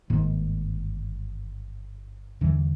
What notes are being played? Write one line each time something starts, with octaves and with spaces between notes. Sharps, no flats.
G1 G#2 D#3 A#3
E2 D3 E3 G3